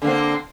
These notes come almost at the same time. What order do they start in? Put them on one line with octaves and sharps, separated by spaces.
D3 A#3 C4